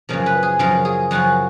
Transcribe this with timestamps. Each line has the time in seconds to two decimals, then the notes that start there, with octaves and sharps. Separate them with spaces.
0.09 F#2 C#3 F3 A#4
0.26 B4
0.43 G#4
0.59 F#2 C#3 F3 A#4
0.85 G#4
1.11 F#2 C#3 F3 F#4